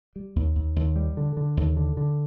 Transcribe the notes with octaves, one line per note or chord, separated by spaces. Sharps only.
G3
D#2
D#2
D#2
G3
D3
D3
D#2
D3
D3